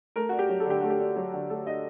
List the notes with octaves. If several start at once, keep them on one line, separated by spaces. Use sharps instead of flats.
A3 A#4
D4 F#4
G4
F#3
A4
D3 G4
A3 F#4
G4
D4
F#3
D3
A3 A4
D4 D#5